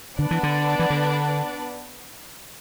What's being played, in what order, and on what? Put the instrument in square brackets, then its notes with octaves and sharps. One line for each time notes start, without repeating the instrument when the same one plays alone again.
[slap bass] D3 [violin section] B3 D4 B4 D5 F#5
[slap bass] E3
D3
E3
D3